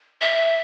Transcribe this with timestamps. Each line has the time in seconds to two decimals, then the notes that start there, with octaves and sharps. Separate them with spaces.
0.21 E5